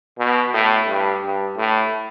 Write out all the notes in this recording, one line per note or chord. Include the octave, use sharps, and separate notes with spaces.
B2
A2
G2
G2
A2